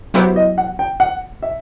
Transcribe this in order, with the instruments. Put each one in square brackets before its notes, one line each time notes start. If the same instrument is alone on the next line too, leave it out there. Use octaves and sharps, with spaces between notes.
[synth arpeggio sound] F#3 B3 E4 G4 [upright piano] C5
[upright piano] D#5
F#5
G5
F#5
E5